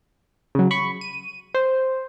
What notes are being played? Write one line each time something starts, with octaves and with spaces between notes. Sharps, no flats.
C#3 F#3
B5 C#6
D#7
C5